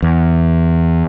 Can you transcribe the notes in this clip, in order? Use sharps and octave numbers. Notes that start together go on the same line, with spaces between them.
E2